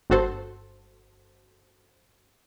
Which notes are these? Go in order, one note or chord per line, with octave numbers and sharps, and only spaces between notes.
G1 G2 F#4 A4 C5